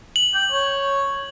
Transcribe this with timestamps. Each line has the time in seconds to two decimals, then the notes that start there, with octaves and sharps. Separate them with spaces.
0.16 F#7
0.34 G5
0.52 C#5